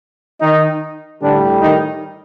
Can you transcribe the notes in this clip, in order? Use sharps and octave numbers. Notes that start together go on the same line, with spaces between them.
D#3 D#4
A2 D3 G3 D4
D#3 D#4